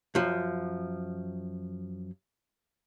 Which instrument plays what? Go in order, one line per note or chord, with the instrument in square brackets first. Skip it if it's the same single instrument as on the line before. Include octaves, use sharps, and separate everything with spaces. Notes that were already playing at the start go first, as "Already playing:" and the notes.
[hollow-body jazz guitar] F#2 F3